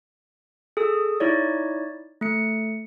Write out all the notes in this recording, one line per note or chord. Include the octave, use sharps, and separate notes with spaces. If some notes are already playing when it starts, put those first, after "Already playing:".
G#4 A4 D#6 E6
D#4 E4 C#5 D5
A3 C#7